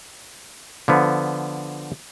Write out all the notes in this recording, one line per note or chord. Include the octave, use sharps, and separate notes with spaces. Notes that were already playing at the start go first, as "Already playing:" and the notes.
D3 F3 B3